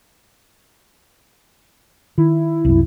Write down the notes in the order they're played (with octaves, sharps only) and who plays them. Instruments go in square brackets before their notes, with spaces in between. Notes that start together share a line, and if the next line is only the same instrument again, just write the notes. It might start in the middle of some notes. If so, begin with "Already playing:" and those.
[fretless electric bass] D#3 [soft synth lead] E4
[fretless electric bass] C2 F#2